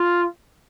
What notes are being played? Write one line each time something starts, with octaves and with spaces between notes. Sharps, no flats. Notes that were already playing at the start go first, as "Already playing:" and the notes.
Already playing: F4